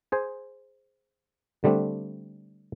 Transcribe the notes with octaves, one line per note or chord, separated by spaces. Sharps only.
G#4 C5 G#5
D3 G3 A3 C4 D4